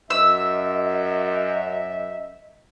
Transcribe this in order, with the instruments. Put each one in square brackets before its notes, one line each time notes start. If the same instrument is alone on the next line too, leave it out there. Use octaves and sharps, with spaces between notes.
[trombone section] F#2 [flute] D#5 [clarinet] E5 [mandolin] E6